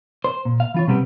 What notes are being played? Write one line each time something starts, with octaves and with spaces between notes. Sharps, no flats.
C5
A#2
F5
E3 F4 C#5
C3 G3 B3 C4 G4